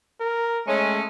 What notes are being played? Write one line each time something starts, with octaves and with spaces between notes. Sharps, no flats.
A#4
G#3 A3 C#4